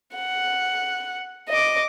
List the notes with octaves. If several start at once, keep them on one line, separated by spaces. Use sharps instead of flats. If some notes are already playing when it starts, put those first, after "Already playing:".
F#5
D#5 D6